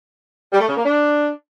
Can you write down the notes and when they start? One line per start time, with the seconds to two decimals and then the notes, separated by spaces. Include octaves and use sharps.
0.52 G3
0.60 A3
0.68 C#3
0.77 A#3
0.85 D4